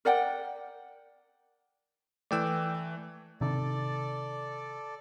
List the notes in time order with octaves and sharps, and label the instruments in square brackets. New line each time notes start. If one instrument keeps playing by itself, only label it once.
[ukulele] A#4 D5 F#5 G5
[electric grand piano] E3 A3 [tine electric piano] D5 G5 E6
[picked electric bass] C3 D#3 [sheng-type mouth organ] A4 D5